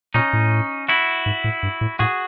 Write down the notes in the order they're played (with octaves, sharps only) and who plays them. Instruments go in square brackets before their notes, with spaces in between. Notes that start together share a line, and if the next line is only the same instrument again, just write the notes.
[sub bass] A#2 [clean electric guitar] C#4 D#4
[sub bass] A2
[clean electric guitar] E4 F#4
[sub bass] G#2
A2
G2
A2
[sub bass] A2 [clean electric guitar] F#4 G#4